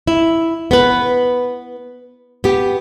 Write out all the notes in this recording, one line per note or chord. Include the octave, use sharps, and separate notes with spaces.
E4
B3 B4
B3 G4